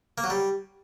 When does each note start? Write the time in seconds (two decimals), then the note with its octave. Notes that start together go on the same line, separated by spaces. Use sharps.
0.18 A#3
0.24 F#3
0.30 G3